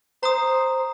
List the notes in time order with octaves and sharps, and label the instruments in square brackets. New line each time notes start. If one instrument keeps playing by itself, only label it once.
[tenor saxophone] C5 [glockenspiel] A#5 D#6